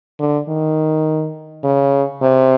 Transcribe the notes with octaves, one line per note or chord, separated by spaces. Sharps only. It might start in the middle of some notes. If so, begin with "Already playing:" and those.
D3
D#3
C#3
C3